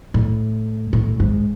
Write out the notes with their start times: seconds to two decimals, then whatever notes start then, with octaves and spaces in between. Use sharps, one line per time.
0.14 A2
0.93 A2
1.20 G#2